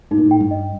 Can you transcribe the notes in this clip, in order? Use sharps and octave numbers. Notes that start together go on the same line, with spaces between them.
A2 D#4
A#2
A2
G5
G2
D#5